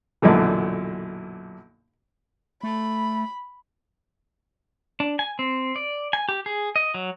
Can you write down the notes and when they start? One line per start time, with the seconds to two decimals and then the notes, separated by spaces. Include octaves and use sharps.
0.22 B1 F#2 A#2 D3 E3
2.63 A3 B5
5.00 D4
5.19 G#5
5.39 C4
5.76 D5
6.13 G#5
6.29 G4
6.46 G#4
6.76 D#5
6.94 F#3